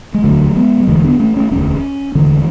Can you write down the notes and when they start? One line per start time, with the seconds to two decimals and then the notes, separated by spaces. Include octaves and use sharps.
0.14 G#3
0.24 E1 D2 D3 F#3 A3
0.56 G#3 B3
0.80 F#3
0.87 E1 D2 D3 E3 G#3
1.04 B3 D4
1.19 A3 C#4
1.36 A3 C#4
1.51 E1 D2 D3 A3 C#4
2.15 E1 D2 D3 E3 G#3